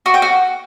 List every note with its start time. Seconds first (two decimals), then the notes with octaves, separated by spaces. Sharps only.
0.06 F#4
0.14 G5
0.22 F#4